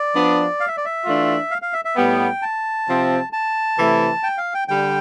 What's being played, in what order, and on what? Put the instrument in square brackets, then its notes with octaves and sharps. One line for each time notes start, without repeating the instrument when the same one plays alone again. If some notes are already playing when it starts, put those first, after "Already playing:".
Already playing: [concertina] D5
[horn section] F3 B3 D4
[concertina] F5
E5
D5
E5
[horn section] E3 A3 D4 F4
[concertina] F5
F5
E5
E5
[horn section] A2 G3 B3 [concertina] G5
[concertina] A5
[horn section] C3 F3 C4
[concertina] A5
[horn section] C3 E3 A3 E4
[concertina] G5
F5
G5
[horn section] D3 G3 [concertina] G5